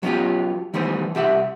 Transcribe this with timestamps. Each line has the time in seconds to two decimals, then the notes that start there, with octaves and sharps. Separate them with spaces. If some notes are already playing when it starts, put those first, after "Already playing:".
0.03 F#3 B3 C#4 F4 G4
0.74 D#3 E3 G3 A3 B3 C5
1.15 C2 G4 E5 F#5